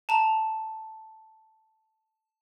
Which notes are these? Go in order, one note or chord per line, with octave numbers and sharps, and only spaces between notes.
A5 A#5 F7